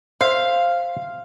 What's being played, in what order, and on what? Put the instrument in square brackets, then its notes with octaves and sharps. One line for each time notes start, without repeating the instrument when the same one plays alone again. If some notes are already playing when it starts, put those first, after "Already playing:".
[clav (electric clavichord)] C5 E5 [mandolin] F5